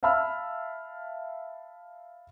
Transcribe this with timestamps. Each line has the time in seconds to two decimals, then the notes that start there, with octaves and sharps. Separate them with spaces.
0.03 E5 F5 A5 B5 E6 F6